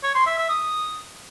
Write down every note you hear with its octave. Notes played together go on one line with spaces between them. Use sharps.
C#5
C6
E5
E5
D#6